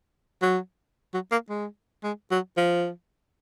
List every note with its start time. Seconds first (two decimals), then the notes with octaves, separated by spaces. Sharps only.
0.42 F#3
1.14 F#3
1.31 A#3
1.49 G#3
2.03 G#3
2.31 F#3
2.57 F3